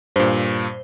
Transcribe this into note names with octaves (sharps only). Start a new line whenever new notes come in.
G2 A#2 C5